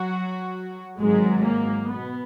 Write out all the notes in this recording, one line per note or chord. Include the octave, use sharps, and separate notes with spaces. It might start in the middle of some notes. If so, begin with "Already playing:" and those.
Already playing: F#3 F#4
G#1 G#2 F#3 G#3
A#3
B2 B3